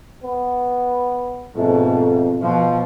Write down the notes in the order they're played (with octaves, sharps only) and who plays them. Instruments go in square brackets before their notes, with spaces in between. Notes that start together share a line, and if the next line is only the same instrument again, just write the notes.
[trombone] B3
[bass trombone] F2 [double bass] G#2 B2 [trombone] A3
[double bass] B2 F3 [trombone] F4